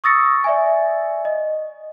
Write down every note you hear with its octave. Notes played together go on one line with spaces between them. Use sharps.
C#6 D#6 E6 A6 A#6 C#7
D5 E5 G#5
D#5